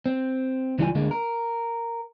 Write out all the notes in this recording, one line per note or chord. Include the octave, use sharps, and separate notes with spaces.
C4
C#2 E3 G3 C#4 F4 G#5
D2 D3 G#3 A#3
A#4